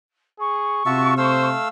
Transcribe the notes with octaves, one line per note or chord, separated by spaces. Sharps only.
G#4 C#6
C3 F4 F#4 E5 A5
A3 C5 F5 E6